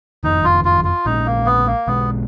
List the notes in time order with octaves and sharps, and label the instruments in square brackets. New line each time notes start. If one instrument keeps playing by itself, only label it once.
[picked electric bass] F#1 F2 D#3 [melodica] D#4
[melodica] F4
F4
F4
[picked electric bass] A#1 A#2 G#3 C#4 [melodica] D#4
[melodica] A#3
B3
A#3
[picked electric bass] B1 B2 G#3 [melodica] B3